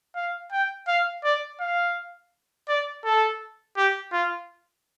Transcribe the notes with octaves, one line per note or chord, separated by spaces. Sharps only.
F5
G5
F5
D5
F5
D5
A4
G4
F4